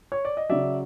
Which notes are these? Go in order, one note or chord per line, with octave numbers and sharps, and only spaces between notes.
C#5
D5
D#5
C#3 F#3 D5 E5